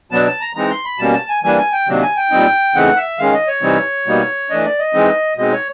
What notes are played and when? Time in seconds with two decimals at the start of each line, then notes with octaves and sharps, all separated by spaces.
0.11 B2 F#3 B3 D4 A5
0.26 A5
0.41 A#5
0.56 E3 G#3 C4 D#4 A#5
0.70 C6
0.85 B5
0.99 B2 G3 A#3 C#4 A5
1.14 A5
1.29 G#5
1.43 E3 G3 A#3 D4 G#5
1.58 G#5
1.72 G5
1.87 C3 D#3 F#3 A#3 D4
2.02 G#5
2.16 G5
2.30 A#2 G3 C4 D#4
2.75 C#3 E3 A3 C4 D#4 F#5
2.96 E5
3.18 D#3 G#3 C#4 F5
3.33 D#5
3.47 C#5
3.62 C3 E3 G3 C4 D#4
4.06 B2 G3 A#3 D#4
4.50 E3 A3 D4 D#5
4.65 D5
4.79 D#5
4.94 E3 G#3 C4 D#4
5.37 B2 G#3 C4 D#4 D#5
5.52 C#5